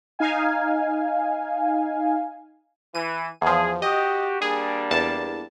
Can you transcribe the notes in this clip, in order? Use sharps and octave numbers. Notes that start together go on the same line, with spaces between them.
D#4 F5 G#5
E3 D#7
E2 F3 G#4
F#4 G4 D#5
G3 A#3 D4 G#4
E2 A5